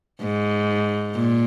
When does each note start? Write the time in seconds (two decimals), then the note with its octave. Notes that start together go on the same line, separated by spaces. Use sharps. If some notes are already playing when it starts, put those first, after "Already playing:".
0.22 G#2
1.15 A#2